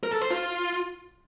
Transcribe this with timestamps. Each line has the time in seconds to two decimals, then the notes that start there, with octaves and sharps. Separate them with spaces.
0.03 A#4
0.12 A4
0.21 C5
0.31 F4